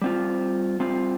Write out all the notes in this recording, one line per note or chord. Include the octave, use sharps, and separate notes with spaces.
G3 C4 F4
G3 C4 F4